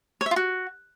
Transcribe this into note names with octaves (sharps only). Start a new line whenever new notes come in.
C#5
E5
F4
F#4